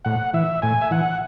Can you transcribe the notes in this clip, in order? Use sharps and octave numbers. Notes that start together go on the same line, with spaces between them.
A2 F#5
E3 E5
A2 G#5
E5
E3 F#5